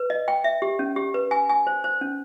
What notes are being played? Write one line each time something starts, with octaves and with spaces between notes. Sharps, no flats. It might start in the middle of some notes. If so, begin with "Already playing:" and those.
Already playing: B4
D#5
G5
E5
G4
C#4
G4
B4
G#5
G#5
C5
C5
C#4